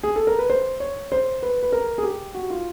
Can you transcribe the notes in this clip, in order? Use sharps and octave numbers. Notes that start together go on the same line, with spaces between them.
G#4
A4
A#4
B4
C5
C#5
C5
B4
B4
A#4
G#4
G4
F#4
F4